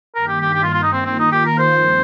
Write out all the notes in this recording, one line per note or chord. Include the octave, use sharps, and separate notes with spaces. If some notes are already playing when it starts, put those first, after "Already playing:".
G2 D#3 A#3 A#4
G4
G4
G4
F4
F4
D#4
D#3 A#3 C4 F4
C4
D#4
G4
A#4
C5
G2 F3 C4 D#4